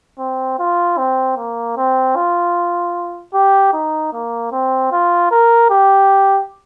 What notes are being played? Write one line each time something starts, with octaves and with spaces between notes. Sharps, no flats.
C4
F4
C4
A#3
C4
F4
G4
D#4
A#3
C4
F4
A#4
G4